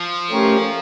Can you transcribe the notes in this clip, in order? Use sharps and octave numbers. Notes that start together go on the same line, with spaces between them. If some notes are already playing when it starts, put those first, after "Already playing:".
Already playing: F3
A3 C#4 G4 A#4 C#5